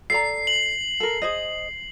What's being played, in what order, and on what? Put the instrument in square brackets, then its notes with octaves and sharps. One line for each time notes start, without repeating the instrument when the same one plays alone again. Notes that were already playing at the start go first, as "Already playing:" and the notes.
[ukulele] A4 D5 A#5 [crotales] C7
[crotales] F#7
[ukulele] A4 A#4
G#4 C5 D#5